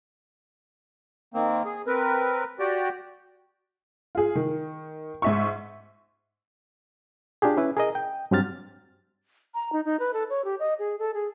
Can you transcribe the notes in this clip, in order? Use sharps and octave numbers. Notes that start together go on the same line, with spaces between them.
D#3 A#3 C4
G#4
C4 A#4 B4
F#4 G4 D5 G5
F4 G#4
D#3
G#2 E5 C#6
D4 F4 G4 G#4
C#4 E4 B4
G#4 A#4 D#5
G5
G2 F#3 C4 G4 F6 A6
A#5
D#4
D#4
B4
A4
C#5
G4
D#5
G#4
A4
G#4